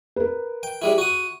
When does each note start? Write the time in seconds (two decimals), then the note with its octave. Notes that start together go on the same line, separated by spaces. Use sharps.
0.16 A#4 B4
0.63 G5
0.82 G3 G#3 E4
0.98 F#4 D#6